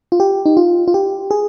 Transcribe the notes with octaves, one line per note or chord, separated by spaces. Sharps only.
F4
G4
D#4
F4
F4
G4
G#4